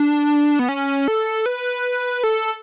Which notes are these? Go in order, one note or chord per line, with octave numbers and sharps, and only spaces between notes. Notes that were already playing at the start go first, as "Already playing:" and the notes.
Already playing: D4
B3
C#4
A4
B4
A4